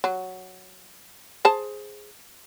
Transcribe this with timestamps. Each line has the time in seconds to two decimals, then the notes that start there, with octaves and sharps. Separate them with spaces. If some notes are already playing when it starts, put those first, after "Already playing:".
0.04 F#3
1.45 G#4 C5 A5